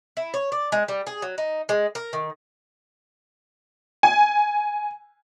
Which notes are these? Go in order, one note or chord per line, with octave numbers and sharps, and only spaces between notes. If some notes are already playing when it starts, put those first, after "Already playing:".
E4
C#5
D5
G#3
G3
G#4
F#3
D#4
G#3
A#4
D#3
G#5